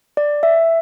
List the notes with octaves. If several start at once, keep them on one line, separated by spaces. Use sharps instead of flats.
D5
E5